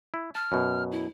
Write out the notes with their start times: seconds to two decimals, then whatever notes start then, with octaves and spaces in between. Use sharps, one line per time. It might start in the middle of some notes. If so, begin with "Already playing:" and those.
0.14 E4
0.35 A5 F6
0.52 F#2 B2
0.92 E4